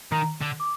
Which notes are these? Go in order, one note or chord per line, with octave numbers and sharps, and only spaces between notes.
D#3 A#5
D3
D6